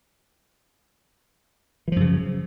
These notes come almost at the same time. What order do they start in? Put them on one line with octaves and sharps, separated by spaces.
E3 F3 F#2 C#3